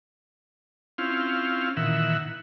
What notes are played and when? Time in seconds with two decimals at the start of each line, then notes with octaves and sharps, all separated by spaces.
0.98 C4 C#4 E4 F4 F5
1.77 A#2 D#3 E3 E5 F#5